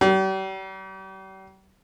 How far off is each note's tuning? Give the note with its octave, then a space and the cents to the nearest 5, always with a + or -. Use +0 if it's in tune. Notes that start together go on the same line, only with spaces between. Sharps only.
G3 -40